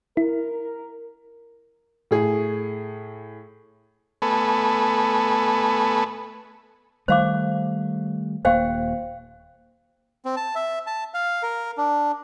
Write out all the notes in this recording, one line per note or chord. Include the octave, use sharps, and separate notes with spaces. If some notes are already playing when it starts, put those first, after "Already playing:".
E4 A#4
A2 G#4
A3 B3 A4 B4 G#5
D#3 G3 A3 C5 F5 D6
D#1 A#3 C5 F5 G5
C4
A5
E5
A5
F5
A#4
D4